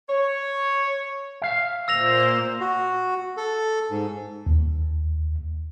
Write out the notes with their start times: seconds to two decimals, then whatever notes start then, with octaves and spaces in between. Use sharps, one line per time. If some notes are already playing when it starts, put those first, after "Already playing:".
0.08 C#5
1.42 E5 F5
1.88 A#2 A#3 C5 E6 A#6 F7
2.61 F#4
3.37 A4
3.90 G#2
4.46 D#2